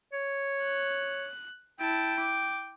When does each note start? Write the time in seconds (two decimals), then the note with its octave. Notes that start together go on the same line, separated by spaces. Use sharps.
0.13 C#5
0.64 F#6
1.80 E4 G5 A5
2.20 D6